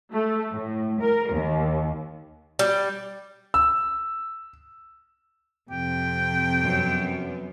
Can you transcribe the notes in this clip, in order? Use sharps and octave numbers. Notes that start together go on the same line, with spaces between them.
A3
A2
A#4
D#2
G3
E6
F2 C3 G5
F#2 B3